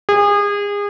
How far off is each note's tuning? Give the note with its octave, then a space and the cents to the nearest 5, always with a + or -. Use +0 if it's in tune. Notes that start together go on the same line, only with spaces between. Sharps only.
G#4 -30